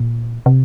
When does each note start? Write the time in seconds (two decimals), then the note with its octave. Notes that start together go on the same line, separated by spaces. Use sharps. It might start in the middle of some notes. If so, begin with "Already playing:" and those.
Already playing: A#2
0.46 C3